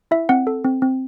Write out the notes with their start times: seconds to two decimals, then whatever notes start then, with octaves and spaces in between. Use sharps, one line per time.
0.11 E4 E5
0.29 C4 F#5
0.47 A4
0.64 C4
0.82 C4